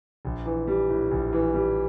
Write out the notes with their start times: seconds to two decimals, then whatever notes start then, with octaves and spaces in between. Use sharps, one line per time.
0.25 A#1
0.46 E3
0.67 G3
0.89 A2
1.11 A#1
1.33 E3
1.54 G3